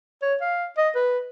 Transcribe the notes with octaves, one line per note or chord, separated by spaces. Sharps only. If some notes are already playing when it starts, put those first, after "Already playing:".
C#5
F5
D#5
B4